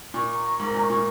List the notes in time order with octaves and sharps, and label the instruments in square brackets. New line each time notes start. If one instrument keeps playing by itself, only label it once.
[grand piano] A#2 [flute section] C#6
[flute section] A#5
[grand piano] G#2 [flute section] A#4
[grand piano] A#2
[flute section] C#6
[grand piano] A#2